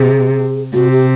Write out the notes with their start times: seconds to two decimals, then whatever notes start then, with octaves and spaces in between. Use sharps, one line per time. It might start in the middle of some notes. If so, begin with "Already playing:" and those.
Already playing: C3 G#4
0.74 C3 F#4
0.91 G4